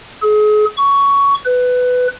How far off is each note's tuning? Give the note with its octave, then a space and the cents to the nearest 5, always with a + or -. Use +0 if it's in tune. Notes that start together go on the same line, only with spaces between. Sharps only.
G#4 +35
C#6 +15
B4 +15